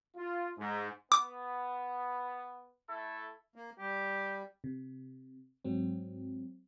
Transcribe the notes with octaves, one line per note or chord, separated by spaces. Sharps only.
F4
G#2
B3 D6
A3 E4 A4
A#3
G3 G4
C3
G#2 F#3 C4